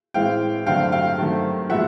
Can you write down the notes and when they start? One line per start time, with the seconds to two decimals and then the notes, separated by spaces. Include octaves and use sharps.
0.14 A2 E3 G#3 C4 F5 G5
0.66 G2 D3 F#3 A3 C4 F5 G5
0.92 F5 G5
1.18 G2 D#3 F#3 A3 C4
1.70 A#2 F3 G#3 B3 E5 F#5